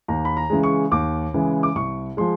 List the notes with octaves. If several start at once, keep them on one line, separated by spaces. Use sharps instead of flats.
D#2 A#5
B5
A#5
C#3 E3 G#3
C#6
D#2 D6
C#3 E3 G#3
D6
C2 C#6
F3 G#3 C6